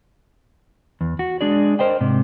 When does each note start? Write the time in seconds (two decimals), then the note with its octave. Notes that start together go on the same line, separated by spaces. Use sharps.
1.01 E2
1.19 F#4
1.41 G#3 D4 G#4 D5
1.79 A#4 C5 D#5 G5
2.01 G#2 C3